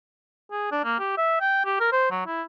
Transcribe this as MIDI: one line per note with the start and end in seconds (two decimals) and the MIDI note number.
0.52 0.68 68
0.72 0.81 62
0.84 0.97 58
0.99 1.13 67
1.18 1.40 76
1.41 1.61 79
1.66 1.78 67
1.80 1.90 70
1.92 2.08 72
2.11 2.22 54
2.26 2.42 64